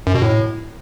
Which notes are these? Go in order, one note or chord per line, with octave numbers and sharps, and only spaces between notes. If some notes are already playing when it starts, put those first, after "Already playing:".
F#2
B2
A2